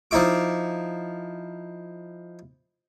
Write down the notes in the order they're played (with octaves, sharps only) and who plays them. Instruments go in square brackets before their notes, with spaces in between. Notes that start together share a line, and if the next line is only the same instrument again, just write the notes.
[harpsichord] F3 D#4 E4 D6